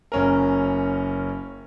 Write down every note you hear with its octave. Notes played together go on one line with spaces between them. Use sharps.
F#1 C#4 A#4